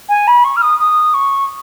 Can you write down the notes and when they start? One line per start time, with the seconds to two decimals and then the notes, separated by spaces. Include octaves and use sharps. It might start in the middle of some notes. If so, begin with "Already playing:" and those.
0.08 G#5
0.27 B5
0.44 C#6
0.56 F6
0.61 D#6
0.79 D#6
1.13 C#6